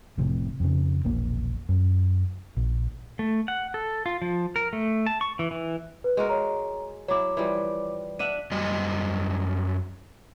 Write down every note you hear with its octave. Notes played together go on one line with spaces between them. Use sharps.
F1 F2 A2 C3
F2 C#3
E1 A#1 A#3
F#2
A#1
A3
F#5
A4
F4
F3
A#4
A3
A5
C#6
E3
E3
B4
G#3 F#4 A#4
C#5 A#5
F#3 E4 C#5 D6
E3 F3 G3
D4 E5 F#5 D#7
F#2 G3 D#5